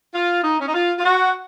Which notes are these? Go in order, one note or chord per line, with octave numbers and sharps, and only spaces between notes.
F4
D#4
C#4
D#4
F4
F4
F#4